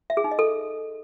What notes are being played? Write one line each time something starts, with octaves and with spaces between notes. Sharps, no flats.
E5
G#4
D#4
D#5
A4